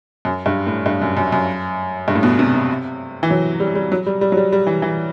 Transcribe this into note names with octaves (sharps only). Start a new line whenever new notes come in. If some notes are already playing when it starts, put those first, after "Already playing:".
F#2
G2
A2
G2
F#2
F#2
F#2
G2
A2
B2
C3
C3
E3
F#3
G3
G3
F#3
G3
G3
F#3
G3
G3
E3
E3